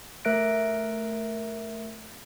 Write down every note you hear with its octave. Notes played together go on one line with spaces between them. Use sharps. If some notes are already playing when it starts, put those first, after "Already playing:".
A3 A#4 E5 F#6 A#6 D7